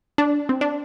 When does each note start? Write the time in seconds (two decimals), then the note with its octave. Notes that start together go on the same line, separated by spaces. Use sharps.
0.18 D4
0.49 C4
0.61 D4